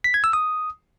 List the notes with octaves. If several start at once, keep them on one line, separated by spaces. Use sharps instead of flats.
B6
G#6
E6
D#6